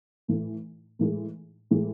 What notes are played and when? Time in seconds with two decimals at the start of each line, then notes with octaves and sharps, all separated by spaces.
0.28 A2 E3 A3
0.99 A2 E3 G#3
1.71 A2 E3 G#3